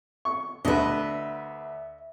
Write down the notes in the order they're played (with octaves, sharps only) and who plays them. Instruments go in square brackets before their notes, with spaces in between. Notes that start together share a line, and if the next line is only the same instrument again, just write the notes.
[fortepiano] C#6
[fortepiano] D2 B4 [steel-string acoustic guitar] D#5 E5